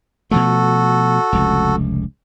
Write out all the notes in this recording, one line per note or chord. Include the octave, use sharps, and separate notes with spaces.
B2 F3 A3 F#4 A4
F1 C#2